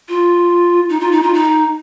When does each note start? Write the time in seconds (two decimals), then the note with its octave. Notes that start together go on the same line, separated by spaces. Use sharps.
0.09 F4
0.89 D#4
1.00 F4
1.12 D#4
1.23 F4
1.34 D#4